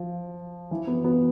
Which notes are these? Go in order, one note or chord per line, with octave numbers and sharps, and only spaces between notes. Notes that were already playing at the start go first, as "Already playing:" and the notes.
Already playing: F3
E3
B3
B3